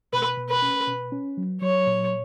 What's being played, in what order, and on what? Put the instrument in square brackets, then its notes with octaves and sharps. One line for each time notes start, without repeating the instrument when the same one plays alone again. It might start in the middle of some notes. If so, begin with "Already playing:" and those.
[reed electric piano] B2 [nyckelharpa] B4
[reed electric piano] B2
[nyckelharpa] B4
[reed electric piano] C#4
B2
C#4
F#3
[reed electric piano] F#3 [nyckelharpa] C#5
[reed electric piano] A#2